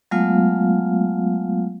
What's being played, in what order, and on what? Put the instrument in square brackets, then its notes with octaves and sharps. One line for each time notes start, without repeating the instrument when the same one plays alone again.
[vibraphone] F#3 G#3 A3 B3 F4 F5